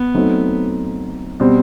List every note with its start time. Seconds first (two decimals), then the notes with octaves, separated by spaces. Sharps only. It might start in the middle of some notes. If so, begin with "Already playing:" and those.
Already playing: B3
0.14 F#3 A3 C4 D#4
1.40 B2 G3 C4